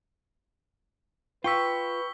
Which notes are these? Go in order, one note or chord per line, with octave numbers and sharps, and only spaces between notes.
F4 B4 G5 C#6 E6 B6 G7